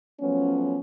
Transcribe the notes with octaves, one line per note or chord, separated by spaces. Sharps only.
F3 F#3 A3 B3 C#4